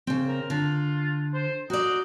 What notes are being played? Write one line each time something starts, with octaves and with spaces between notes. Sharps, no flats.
C#3 C4
A#4
D3 F4
C5
D#4 F#4 D5